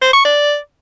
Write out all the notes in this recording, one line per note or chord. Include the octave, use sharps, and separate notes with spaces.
C5
C#6
D5